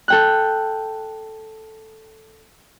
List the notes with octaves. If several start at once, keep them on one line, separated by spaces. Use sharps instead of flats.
A4 G5 F#6